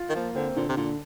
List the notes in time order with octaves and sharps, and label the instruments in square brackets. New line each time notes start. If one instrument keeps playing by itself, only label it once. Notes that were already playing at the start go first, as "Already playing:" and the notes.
Already playing: [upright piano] F4
[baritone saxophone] D#3
[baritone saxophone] F3 [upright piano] A#3
[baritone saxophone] D3 [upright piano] C4
[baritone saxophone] A#2 [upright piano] D3
[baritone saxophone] C3
[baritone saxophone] A#2 [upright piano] D3